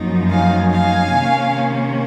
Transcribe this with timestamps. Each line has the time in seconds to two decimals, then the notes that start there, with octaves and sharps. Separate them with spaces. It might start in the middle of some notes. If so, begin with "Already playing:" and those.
Already playing: F#2 F3 A#3 D#4
0.31 F5 G#5
0.71 F5 G#5
1.11 C3 D#3 A#3 C#4